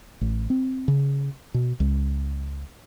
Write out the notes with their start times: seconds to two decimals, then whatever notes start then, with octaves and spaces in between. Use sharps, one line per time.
0.21 A1
0.50 C4
0.88 C#3
1.54 B2
1.80 C#2